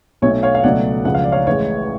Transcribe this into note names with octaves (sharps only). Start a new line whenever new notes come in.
B1 B2 A3 C#5
C#5 F5
F5
C#2 B2 F#3 A3 D5 F#5
C#2 C#3 F3 F#5
F5
D5
C#5 F5
A1 A2 G#3 C#5